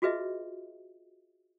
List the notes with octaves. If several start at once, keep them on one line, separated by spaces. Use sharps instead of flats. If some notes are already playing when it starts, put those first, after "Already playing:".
F4 F#4 G#4 B4 D#5 E5